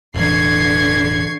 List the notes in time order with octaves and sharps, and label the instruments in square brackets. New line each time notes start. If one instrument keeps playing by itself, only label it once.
[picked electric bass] E1 A1 [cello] D3 E3 [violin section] C#6 G#6 C7